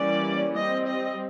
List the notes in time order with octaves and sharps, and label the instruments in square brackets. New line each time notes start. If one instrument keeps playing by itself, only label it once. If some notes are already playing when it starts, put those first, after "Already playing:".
Already playing: [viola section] E3 G3 A#3 C#4 D5
G3 C4 D#5
D#5